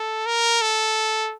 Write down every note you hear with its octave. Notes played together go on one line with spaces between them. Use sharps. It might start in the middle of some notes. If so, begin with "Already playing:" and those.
Already playing: A4
A#4
A4